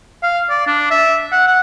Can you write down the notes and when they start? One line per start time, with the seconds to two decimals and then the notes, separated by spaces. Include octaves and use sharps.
0.23 F5
0.50 D5
0.67 D4
0.91 E5
1.32 F#5
1.47 F#5